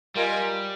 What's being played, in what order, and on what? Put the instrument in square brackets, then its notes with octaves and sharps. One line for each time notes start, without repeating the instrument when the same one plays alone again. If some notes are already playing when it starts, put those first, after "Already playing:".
[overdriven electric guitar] G3 [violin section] F4 A#4 D#5 G#5